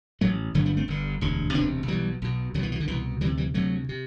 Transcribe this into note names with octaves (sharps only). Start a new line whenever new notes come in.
A1 A2 F#3 A3
G1 G2 D3 F#3 A3
G3 B3
A3 C4
G1 G2 D3
E1 D2 C3
E1 D2 C3 B3 D4
B1 B2 E3 G3
B1 B2
C2 B2 D3 E3 F#3
E3
D3
C2 B2 E3
D2 C3 E3 G3
E3 G3
D2 C3 F#3 A3
C3